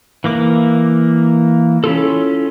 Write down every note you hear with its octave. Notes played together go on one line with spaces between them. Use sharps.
E3 A#3 D6
C#4 E4 F4 A4